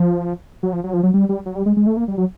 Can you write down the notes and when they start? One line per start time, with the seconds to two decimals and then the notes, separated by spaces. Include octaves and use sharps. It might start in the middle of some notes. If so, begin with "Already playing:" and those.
Already playing: F3
0.63 F#3
0.73 F3
0.84 F#3
0.94 F3
1.03 F#3
1.14 G3
1.29 G3
1.46 F#3
1.55 G3
1.66 G#3
1.77 G#3
1.87 A3
1.97 A#3
2.08 G3
2.18 F#3